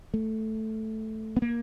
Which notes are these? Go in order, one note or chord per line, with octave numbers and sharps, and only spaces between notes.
A3
B3
A#3